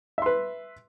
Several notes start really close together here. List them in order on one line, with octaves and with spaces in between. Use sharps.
E5 C6 B4